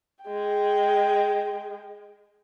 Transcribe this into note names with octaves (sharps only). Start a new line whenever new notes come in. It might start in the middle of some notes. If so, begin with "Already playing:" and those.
G#3 G5